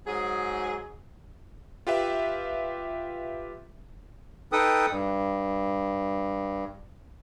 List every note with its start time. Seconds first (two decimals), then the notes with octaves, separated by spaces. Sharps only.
0.06 G#2 F#3 G#4
1.87 F4 G4 B4 E5
4.52 D#4 A4 B4 G5 D#6
4.90 G2